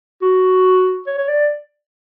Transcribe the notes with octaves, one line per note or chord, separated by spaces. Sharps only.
F#4
C#5
C#5
D5